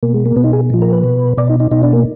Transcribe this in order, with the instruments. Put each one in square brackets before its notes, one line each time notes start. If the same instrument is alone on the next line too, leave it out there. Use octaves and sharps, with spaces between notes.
[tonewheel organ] B2 A#3
G#3
A#3
B2 B3
D#4
G#4
A#2 F3
A#4
B4
B2
B2 D5
D#4
D#4
B2 D#4
D4
A#3